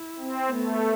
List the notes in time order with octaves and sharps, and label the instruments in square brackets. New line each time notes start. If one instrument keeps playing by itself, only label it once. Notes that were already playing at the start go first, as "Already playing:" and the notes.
Already playing: [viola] E4
[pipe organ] C4
[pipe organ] A3 [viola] B3